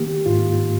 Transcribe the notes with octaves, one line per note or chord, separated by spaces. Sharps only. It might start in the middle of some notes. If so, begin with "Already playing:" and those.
Already playing: D#3 A#3 G4
G#2 F4